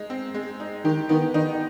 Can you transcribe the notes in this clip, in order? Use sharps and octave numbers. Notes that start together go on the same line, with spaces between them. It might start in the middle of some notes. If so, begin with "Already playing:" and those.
Already playing: G#3 D#4
C4
G#3
D#4
D#3 G4
D#3 B3
D#3 D#4